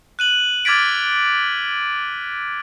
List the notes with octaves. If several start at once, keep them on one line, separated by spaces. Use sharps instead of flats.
F#6 D#7 F#7
D6 F6 G#6 A6 B6 D7